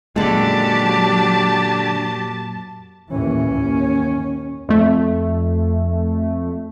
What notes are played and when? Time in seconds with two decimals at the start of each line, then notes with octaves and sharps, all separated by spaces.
0.16 F#2 A#2 D3 F#3 G#3 G4 A5
3.11 D#2 A2 E3 C#4
3.51 D#2
4.69 F2 A3